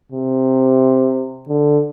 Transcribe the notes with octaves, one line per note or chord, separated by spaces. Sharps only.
C3
D3